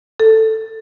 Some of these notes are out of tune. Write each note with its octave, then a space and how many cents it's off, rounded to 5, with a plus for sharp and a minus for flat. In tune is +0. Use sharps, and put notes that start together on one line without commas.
A4 +10